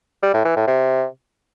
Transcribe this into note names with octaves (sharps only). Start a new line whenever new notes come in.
G3
A2
E3
A2
C3